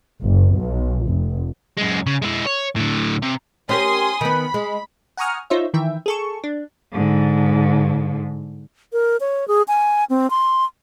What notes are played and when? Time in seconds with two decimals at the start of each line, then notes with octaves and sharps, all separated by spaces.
0.21 F#1
0.56 B1
1.06 F1
1.78 F#2 G#3
2.06 C#3
2.22 G#3 E4
2.47 C#5
2.76 A2 D3
3.22 C3
3.69 C#4 G4 A#4 G#5 C6 D#6
4.21 D#3 B3 B5
4.54 G#3
5.17 F#5 G#5 A#5 C#6 D#6 F6
5.50 D#4 F4 C5 C#5 E5
5.74 D#3 E3 E5 G5
6.06 G#4 A4 C#6
6.44 D4
6.93 G#2 D3
8.93 A#4
9.20 C#5
9.48 G#4
9.68 G#5
10.10 C4
10.30 C6